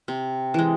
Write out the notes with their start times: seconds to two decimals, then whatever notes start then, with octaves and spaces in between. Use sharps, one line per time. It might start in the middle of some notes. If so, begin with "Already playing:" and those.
0.08 C3
0.54 E3 G#3